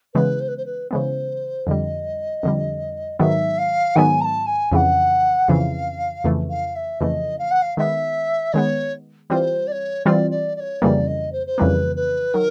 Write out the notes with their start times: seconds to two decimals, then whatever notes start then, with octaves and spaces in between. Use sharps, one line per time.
0.14 C#3 E3 G#3 B3 B4
0.40 C5
0.48 B4
0.57 C5
0.66 B4
0.91 C#3 E3 G#3 B3 C5
1.67 F2 D3 G3 D#5
2.43 F2 D3 G3
3.19 G#2 D#3 F#3 B3 E5
3.58 F5
3.96 G#2 D#3 F#3 B3 G#5
4.21 A#5
4.24 A5
4.46 G#5
4.72 F2 C#3 E3 F#5 G#5
5.48 F2 C#3 E3 F5
6.24 F2 C#3 E3 A3
6.50 F5
6.75 E5
7.00 F2 C#3 E3 A3 D#5
7.39 F5
7.51 F#5
7.62 F5
7.77 D#3 G#3 B3 E5
8.53 D#3 G#3 B3 C#5
9.30 E3 G3 C4 F4 C5 C#5
9.67 D5
9.72 C#5
10.06 E3 G3 C4 F4 D5
10.31 D5
10.56 D5
10.60 C#5
10.81 F2 C#3 E3 G3 A#3 D5
11.07 D#5
11.32 C5
11.47 C5
11.58 F2 C#3 E3 G3 A#3 B4
11.96 B4
12.34 D#3 F#3 A#4